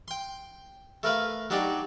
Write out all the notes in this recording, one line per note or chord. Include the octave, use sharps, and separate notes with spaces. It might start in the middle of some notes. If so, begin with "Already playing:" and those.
G5 C6
A3 A#4 B4 F5
F#3 D4 D#4 G4 D5